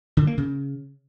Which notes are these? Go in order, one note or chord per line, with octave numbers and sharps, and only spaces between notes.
D3
A#3
C#3